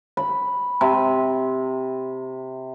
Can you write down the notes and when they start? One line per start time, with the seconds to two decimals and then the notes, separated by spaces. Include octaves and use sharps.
0.17 B5
0.81 C3